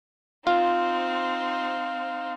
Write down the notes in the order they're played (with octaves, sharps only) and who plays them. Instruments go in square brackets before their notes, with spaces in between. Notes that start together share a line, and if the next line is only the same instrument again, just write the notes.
[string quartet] C4 D#4 C5 [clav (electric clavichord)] F4 [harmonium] F5